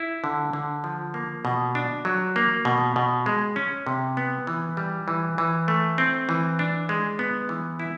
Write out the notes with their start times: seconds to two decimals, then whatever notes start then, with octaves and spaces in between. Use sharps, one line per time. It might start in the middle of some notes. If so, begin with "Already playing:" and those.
Already playing: E4
0.24 D3
0.53 D3
0.84 F3
1.14 A#3
1.45 B2
1.75 D4
2.05 F#3
2.36 A#3
2.65 B2
2.96 B2
3.26 G#3
3.56 C#4
3.87 C3
4.17 B3
4.47 E3
4.77 G3
5.08 E3
5.38 E3
5.68 A3
5.98 C4
6.29 E3
6.59 D4
6.89 G#3
7.19 B3
7.49 E3
7.79 E4